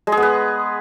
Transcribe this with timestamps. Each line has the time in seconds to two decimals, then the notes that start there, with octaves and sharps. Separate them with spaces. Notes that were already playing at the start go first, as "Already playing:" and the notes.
0.07 G#3
0.12 G#4
0.17 B3
0.22 B4